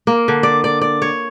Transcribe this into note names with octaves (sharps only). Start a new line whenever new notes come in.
A#3
D3
D5
D5
D5
C#5